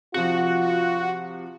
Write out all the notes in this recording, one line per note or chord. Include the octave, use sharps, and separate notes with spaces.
C3 F3 F4 F#4